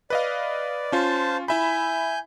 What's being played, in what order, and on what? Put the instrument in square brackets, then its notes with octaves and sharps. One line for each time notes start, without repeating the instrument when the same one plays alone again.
[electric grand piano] B4 D#5 F5 [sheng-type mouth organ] D5
[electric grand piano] C#4 F4 [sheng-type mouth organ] C5 A5
[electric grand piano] E4 E5 B5 [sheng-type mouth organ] G#5 G6